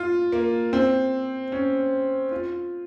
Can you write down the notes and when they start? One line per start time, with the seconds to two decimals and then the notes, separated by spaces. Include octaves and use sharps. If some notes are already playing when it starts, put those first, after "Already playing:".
Already playing: F4
0.32 A#3
0.73 C4
1.52 C#4
2.31 F4